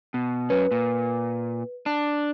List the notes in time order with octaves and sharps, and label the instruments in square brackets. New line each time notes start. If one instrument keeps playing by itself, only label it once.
[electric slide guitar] B2
[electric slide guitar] F#2 C#4 [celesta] B4
[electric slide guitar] A#2
D4